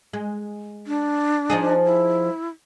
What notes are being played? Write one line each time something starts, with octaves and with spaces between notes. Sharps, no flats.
G#3
D4
F3 D#4 G#4
E4